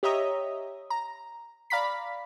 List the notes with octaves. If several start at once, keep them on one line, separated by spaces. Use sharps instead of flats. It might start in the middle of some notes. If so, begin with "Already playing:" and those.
G4 C#5 D#5 E5 A#5 D#6
A#5
D5 F5 A#5 B5 B6